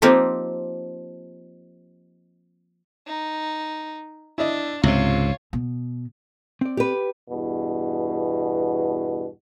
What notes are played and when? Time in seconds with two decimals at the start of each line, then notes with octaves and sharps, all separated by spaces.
0.02 F3 A#3 C4 D#4 G4
3.07 D#4
4.38 D4 E4 D#5
4.83 C#2 G#2 C3 F4 C#5
5.53 B2
6.61 C4 D5
6.77 G4 B4
7.30 E2 G2 B2